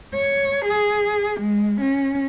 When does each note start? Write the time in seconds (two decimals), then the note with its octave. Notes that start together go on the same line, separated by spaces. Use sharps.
0.14 C#5
0.65 G#4
1.40 G#3
1.81 C#4